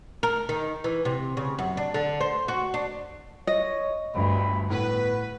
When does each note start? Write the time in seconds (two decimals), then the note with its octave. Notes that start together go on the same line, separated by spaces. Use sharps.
0.23 A#4
0.49 D#3
0.84 E3
1.05 C3
1.37 C#3
1.59 F#2
1.77 D4
1.94 D3
2.21 C5
2.48 F#4
2.74 D4
3.47 C#5 D#5
4.15 G1 D2 G2 B5
4.70 A2 B3 B4